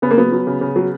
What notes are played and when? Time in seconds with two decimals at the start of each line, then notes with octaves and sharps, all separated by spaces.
0.02 C#3 B3
0.11 A#3
0.18 F#3 B3
0.32 F#3
0.47 C#3
0.61 C#3
0.76 F#3